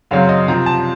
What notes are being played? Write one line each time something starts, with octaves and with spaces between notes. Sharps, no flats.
F#2 C#3 F#3 C4 F5
D#5
C3 F3 C4 A#5
A5